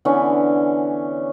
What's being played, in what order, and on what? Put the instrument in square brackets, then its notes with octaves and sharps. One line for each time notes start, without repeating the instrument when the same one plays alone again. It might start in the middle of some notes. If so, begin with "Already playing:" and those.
[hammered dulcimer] D3 E3 B3 C#4